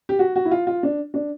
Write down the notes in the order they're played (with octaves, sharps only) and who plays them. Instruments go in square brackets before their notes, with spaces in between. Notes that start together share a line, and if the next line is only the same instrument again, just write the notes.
[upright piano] G4
F#4
F#4
E4
F4
F4
D4
D4